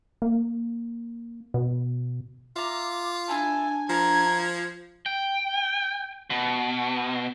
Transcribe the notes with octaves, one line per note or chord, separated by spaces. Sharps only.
A#3
B2
F4 E5 A#5 D6
D4 E4 A4 G#5
F3 A#4 A5 A#5 G#6
G5
B2